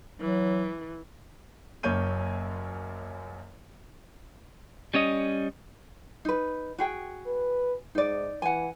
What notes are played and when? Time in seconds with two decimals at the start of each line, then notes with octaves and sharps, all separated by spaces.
0.20 E3 F#3
1.83 F#1 F#2 A#3 C#5 G6 D#7
4.94 G3 C#4 C#5 D#5
6.25 D#4 B4
6.78 F#4 G#4 G5
7.26 B4
7.95 G#2 D#4 D5
8.42 E3 F#5 G#5